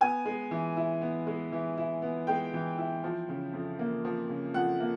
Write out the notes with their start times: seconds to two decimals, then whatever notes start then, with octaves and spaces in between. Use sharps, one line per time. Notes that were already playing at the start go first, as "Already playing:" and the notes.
0.01 B3 G#5
0.26 G#3
0.51 E3
0.77 E4
1.01 B3
1.27 G#3
1.52 E3
1.78 E4
2.02 B3
2.27 G#3 G5
2.53 E3
2.78 E4
3.04 F3
3.29 C#3
3.53 F2
3.79 A#3
4.05 F3
4.29 C#3
4.54 F2 F#5
4.80 A#3